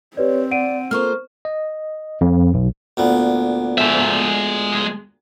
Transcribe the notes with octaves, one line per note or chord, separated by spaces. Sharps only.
C4 G4 B4 C#5 D5
D5 F#5 D7 D#7
A#3 F4 A4 C5 C#6 F6
D#5
F2
B1
D2 A#2 B3
G#3 E5